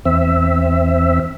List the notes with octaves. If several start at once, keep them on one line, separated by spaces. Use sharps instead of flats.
E2 C4 E5